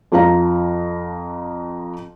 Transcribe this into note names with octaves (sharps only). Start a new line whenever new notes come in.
F2 F3 F5 A#5